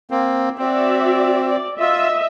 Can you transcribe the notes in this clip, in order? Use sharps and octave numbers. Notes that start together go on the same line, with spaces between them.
A#3 C4
C4 F#4 D5 E5
D5
F4 D#5 E5